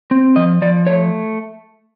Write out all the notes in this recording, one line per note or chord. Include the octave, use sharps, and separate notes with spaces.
C4
F3 D#5
F3 D5
A3 C#5